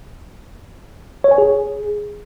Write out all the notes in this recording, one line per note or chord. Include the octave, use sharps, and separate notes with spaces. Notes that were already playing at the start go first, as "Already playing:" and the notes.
C#5
G#5
G#4